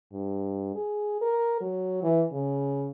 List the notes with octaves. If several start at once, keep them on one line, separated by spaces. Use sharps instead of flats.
G2
G#4
A#4
F#3
E3
C#3